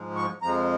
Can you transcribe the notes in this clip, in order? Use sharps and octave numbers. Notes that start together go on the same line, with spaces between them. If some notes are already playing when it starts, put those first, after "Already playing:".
Already playing: G#2 F3 G#3
C#6
F2 F3 G#3 A#5